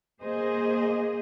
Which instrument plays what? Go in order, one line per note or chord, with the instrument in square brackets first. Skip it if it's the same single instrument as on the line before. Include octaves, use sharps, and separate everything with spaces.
[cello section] A#3 G#4 C5 D#5